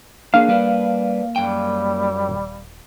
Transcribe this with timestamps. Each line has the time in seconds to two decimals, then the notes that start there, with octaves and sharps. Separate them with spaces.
0.34 A#3 D4 G#4 F5
0.48 G3 B4 D5
1.36 F#2 G3 G5
2.29 D#1